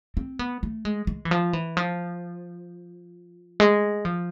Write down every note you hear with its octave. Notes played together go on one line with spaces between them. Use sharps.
C4
B3
A3
G#3
G#3
E3
F3
E3
F3
G#3
F3